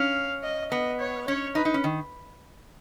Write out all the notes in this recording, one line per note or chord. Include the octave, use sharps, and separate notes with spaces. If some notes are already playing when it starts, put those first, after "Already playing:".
Already playing: C#4 F5
D#5
B3 D#5
C#5
C#4 C#5
D#4 B4
D#4
C#4
D#3